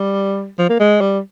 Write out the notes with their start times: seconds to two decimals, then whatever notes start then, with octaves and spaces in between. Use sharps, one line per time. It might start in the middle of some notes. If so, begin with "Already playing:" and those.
Already playing: G3
0.58 F3
0.70 A#3
0.80 G#3
1.01 G3